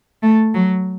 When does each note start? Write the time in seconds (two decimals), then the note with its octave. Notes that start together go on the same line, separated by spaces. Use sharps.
0.23 A3
0.54 F#3